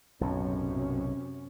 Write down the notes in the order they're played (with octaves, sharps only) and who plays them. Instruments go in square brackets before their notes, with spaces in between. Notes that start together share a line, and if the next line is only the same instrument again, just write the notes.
[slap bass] B1 A2 [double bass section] F#2 C3 [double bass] C#4